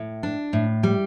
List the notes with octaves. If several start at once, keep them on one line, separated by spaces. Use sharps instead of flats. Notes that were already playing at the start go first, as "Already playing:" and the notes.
Already playing: A2
D4
A2
G3